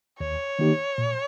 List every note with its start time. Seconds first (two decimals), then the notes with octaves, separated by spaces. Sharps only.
0.19 D#2 C#5
0.59 D#3 A#3 D#4 G4
0.98 A#2